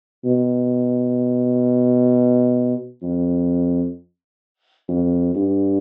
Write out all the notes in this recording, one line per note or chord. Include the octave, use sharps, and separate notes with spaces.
B2
F2
F2
G2